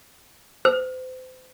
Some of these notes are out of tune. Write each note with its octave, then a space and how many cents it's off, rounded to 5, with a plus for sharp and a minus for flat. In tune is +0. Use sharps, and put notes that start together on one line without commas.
C5 -35